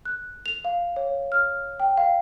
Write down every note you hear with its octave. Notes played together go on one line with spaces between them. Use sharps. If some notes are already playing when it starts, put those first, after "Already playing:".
F#6
F7
F5
C#5
F6
G5
F5